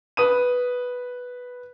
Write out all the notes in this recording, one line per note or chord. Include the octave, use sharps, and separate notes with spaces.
B4 D#6 D#7